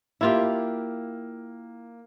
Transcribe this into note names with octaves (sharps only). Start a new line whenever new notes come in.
A#3 E4 F4 G4